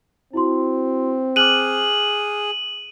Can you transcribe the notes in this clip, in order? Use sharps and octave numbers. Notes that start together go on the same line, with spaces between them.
C4 E4 F#4 C6
G#4 D6 F6 F#6 D#7 F#7